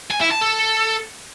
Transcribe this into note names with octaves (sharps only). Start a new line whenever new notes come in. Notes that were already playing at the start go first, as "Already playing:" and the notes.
G#5
E4
A5
A4